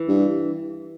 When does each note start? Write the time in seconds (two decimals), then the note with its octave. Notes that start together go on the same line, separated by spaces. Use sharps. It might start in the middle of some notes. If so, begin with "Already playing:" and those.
Already playing: E3
0.08 G2